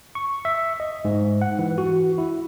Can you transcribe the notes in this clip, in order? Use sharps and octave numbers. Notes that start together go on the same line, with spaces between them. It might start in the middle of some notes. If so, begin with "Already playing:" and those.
C#6
E5
D#5
G#2
F#5
E3
F#4
E4